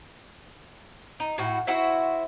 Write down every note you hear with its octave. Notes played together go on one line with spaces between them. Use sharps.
D#4
A2 E4 F#4
E4 F#4 C5 E5